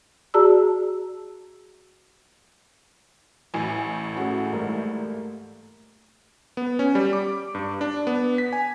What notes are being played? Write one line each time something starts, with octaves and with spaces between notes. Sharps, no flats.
F#4 G#4 D5 A5 A#5 E6
A1 A2 G#5
A3 C#4 F#4 G#4
G#2 G3 A#3
B3
C#4
G3
D6
G2
D4
B3
B6
G#5